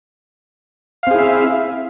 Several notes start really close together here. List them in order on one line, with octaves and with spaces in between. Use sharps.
F5 C4 G#4 E4 E5